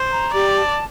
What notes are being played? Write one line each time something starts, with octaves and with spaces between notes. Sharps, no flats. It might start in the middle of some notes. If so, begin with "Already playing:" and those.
Already playing: C5
A#5
G4 D5
A5